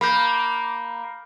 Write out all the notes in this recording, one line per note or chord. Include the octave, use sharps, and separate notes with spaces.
A#3 B5 G6